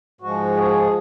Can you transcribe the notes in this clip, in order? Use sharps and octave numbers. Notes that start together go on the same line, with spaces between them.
G#2 F3 G#3 F#4
G#4